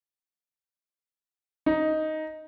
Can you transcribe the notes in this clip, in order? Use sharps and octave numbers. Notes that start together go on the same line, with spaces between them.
D#4